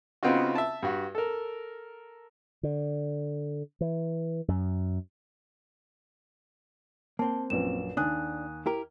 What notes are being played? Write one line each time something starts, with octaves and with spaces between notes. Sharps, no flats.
C#3 B3 C4 D#4 F4 F#4
E5 A5
G2 F#4
A4 A#4
D3
E3
F#2
A#3 C4 A5
A#1 F#2 B4 E7
D#2 D4 G#5 D#6 F#6
E4 G4 A#4